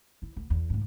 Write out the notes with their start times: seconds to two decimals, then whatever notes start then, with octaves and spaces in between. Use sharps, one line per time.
0.22 E4
0.37 D2
0.50 E2
0.70 F1 G#2